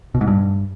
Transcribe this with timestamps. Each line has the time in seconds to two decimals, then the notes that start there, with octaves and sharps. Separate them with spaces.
0.15 B2
0.21 G#2
0.27 G2